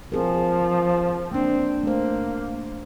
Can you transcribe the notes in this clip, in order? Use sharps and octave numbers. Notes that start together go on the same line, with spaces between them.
F3 C4 G#4 A#4
A#3 C4 D4
A3 A#3 C5